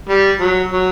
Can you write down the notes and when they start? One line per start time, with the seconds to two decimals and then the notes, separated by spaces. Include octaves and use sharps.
0.09 G3
0.40 F#3
0.72 F#3